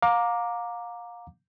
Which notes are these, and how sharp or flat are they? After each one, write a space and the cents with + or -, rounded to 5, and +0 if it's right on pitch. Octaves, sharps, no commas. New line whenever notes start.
F5 +30 A#5 +0 D6 +0